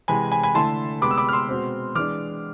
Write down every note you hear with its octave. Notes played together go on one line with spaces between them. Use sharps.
C3 E3 G#3 G#5 B5
G#5 B5
G#5 B5
D3 A3 E4 A5 C6
C3 G#3 B3 B5 D6
E6
B5 D6
F6
C6 E6
B2 G#3 C4
E3 G#3 D4 D6 F6